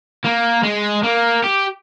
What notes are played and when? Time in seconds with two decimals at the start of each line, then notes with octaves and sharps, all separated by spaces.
0.25 A#3
0.64 G#3
1.04 A#3
1.44 G4